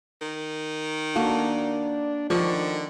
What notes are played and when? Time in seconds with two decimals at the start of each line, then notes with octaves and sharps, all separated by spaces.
0.21 D#3
1.15 A#3 D4 F#4 A4
2.30 D3 D#3 F3 C#6